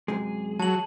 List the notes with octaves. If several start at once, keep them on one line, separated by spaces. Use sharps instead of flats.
F#2 C3 G#3 G#4
F#3 A5 F#7